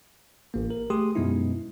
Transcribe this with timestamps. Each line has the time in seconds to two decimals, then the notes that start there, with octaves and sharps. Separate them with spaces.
0.54 A1 A#3
0.70 A#4
0.90 A3 G4 G#4 C6 D#6
1.15 F#2 B2 G#3 B3 D#4 E4